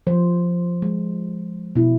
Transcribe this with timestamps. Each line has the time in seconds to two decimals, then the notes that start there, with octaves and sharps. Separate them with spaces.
0.07 F3 C5
0.82 G#3
1.76 B2 E4